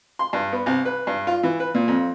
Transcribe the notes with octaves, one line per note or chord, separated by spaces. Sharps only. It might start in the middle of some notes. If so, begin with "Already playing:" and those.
C6
G2
B3
C2
B4
G2
F4
E3
B4
A#2
F2